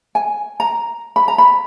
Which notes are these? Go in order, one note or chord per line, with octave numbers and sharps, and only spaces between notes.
G#5
A#5
B5
A#5
B5